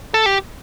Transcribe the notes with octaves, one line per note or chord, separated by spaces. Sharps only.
A4
G4